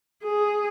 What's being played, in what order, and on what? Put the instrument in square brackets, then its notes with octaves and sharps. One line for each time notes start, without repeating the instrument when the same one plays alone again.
[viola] G#4